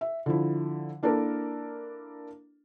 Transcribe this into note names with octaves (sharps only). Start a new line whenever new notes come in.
E5
D3 F3 E4
A#3 D4 E4 A4 A#4